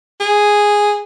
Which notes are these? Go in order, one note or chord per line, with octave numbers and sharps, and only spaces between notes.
G#4